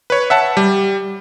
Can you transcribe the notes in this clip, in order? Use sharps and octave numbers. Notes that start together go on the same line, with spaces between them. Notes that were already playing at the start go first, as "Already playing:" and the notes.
B4 C#5
E5 F#5 A5
G3